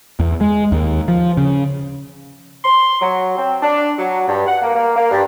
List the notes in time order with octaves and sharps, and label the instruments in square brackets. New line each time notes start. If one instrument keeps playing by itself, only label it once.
[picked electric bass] E2
G#3
D#2
F3
C#3
[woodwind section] C6
F#3
C4
D4
F#3
G2
F#5
A#3
A#3
A#3
G2